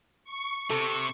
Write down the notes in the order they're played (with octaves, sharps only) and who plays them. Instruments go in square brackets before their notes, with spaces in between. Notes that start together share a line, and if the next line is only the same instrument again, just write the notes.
[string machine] C#6
[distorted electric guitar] C3 [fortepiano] A4